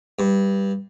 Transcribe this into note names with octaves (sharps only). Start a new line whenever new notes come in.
G2